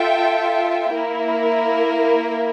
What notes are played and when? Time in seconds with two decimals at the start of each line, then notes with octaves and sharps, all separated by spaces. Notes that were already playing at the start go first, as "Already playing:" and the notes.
Already playing: F4 A4 E5 G5
0.93 A#3 E4 A#4